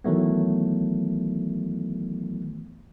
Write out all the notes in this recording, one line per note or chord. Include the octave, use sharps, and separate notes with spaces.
D#3 E3 F#3 A3 B3